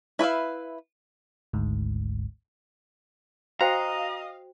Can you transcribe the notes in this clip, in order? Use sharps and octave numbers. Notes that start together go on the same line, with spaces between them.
E4 B4 E5 F5
G#1 D2 G#2
F#4 C5 D#5 F5 G5 A#5 D#6